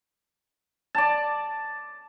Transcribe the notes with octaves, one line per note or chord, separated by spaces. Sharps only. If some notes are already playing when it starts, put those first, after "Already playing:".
D5 A5